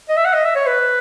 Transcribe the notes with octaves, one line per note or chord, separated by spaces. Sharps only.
D#5
E5
F#5
D#5
E5
C#5
B4